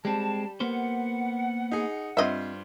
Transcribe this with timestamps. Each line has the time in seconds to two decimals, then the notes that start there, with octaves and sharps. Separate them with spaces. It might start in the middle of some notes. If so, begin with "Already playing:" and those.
0.05 G3 G#3 C4 A5
0.60 A#3 B3 C5 F#5
1.72 D#4 G#4
2.17 G2 C4 F4 C5 D#5 E5